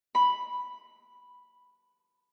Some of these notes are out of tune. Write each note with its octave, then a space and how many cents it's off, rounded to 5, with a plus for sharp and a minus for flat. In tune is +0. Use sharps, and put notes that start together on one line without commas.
B5 +0